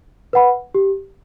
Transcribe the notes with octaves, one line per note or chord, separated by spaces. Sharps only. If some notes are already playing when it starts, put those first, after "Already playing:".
B4 F#5 B5
G4